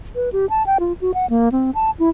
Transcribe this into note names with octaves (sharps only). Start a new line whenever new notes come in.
B4
G4
A5
G5
F4
F#4
F#5
A#3
C4
A5
E4